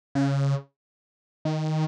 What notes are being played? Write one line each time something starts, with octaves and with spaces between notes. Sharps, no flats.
C#3
D#3